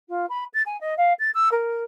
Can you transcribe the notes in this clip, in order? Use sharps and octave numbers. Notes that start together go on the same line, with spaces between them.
F4
B5
A6
G#5
D#5
F5
A6
E6
A#4